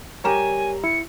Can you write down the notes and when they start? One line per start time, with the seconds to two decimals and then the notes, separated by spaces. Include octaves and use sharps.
0.24 G3 G4 A#4 C#5 G#5 A#5 E7
0.84 E4 C#7